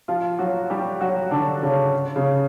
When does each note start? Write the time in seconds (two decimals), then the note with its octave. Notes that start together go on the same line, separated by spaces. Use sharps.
0.08 F3 F4
0.39 F#3 F#4
0.70 G3 G4
1.01 F#3 F#4
1.31 D3 D4
1.62 C#3 C#4
2.16 C#3 C#4